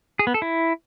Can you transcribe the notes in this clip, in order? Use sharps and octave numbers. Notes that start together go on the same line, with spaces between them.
G#4
B3
A4
E4